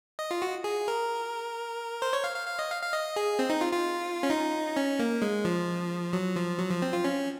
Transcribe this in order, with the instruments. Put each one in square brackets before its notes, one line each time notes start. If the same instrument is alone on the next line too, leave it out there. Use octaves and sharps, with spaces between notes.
[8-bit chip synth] D#5
F4
F#4
G#4
A#4
C5
C#5
F5
F5
F5
D#5
F5
F5
D#5
G#4
C4
D#4
F4
F4
C#4
D#4
C#4
A#3
G#3
F3
F#3
F3
F#3
F3
C4
F4
C#4